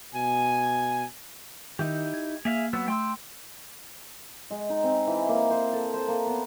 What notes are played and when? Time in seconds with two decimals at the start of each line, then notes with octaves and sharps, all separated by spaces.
0.15 B2 G#5
1.79 D#3 D#4 E4 G4
2.14 G#6
2.45 A#3 G#4 E5 F5
2.73 F#3 B3 E6
2.88 A3 G5 C6 E6
4.51 G#3
4.70 D#4
4.84 C4
5.07 E3
5.29 A#3
5.50 C5
5.73 A4
5.94 C5
6.08 A#3
6.27 B3